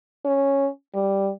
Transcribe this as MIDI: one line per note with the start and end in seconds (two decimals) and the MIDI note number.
0.25 0.68 61
0.95 1.31 55